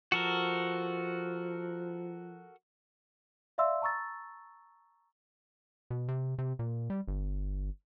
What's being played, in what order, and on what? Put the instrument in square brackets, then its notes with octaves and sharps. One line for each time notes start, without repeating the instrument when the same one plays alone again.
[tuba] F3 [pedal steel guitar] F#4 A4 A#4
[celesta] D5 E5 F5 C6 E6
A5 A#5 C#6 E6 A6
[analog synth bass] B2
C3
C3
A#2
G3
G1